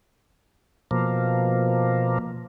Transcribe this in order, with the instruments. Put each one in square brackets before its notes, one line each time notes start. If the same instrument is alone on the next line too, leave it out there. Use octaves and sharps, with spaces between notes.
[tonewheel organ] B2 F3 A#3